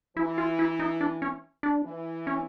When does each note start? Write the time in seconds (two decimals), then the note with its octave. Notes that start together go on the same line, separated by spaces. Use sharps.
0.17 E3 E4
0.38 F4
0.59 E4
0.79 D#4
1.01 D4
1.22 C#4
1.63 D4
1.85 E3
2.27 C#4